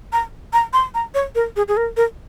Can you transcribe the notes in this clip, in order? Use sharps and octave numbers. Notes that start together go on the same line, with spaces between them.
A#5
A#5
C6
A#5
C#5
A#4
G#4
G#4
A#4
A#4